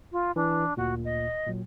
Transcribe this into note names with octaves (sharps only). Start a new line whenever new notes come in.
F4
E3 D4
D2 A#2 F#4
D#5
A#2 F#3